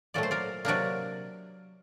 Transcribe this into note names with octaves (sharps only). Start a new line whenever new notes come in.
A#2 F#3 A3 D5
C5
A#4 D5
C3 F#3 A#3 D4 A#4 D5